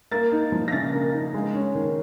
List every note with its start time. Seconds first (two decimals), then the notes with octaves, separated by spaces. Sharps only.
0.11 A#3 A6
0.32 D#4
0.52 F3
0.68 A#6
0.72 C#3 A6
0.93 A#3
1.13 D#4
1.34 G#3
1.54 C#4
1.75 D#3